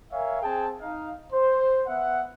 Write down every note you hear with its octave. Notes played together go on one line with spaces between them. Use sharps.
A#4 C#5 E5 F5 G#5
C4 G#4 G5 A5
D#4 F5
C5
B3 E5 F#5